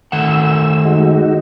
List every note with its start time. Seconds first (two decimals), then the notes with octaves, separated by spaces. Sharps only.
0.12 D#3 A3 F#5 E6
0.85 G#3 D#4 F#4